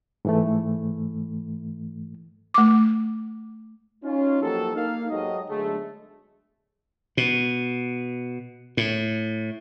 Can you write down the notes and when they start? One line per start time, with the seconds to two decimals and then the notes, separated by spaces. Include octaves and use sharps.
0.25 G#2 E3 A3
2.54 A3 D6
4.04 C#4 D#4 F4
4.42 F3 F#3 A#3 D#4 G4 A4
4.76 A#3 D#4 F5
5.10 G#2 F#3 G4 A4 D#5
5.49 B1 D3 G#3 A3
7.17 B2
8.77 A2